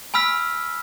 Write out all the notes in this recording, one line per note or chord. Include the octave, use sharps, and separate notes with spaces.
G#5 B5 E6 F6 B6